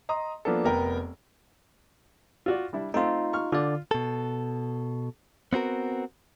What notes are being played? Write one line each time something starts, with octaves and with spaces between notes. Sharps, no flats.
D#5 A#5 C6 D#6
F3 A#3 B3 D4 A4
F1 B3 A#4 G5
F4 F#4 D5
G3 D4 E4
A3 C4 D#4 F4 C6
C#6 F6
D3 F4 D5
B2 A4
B3 C4 F#4 A#4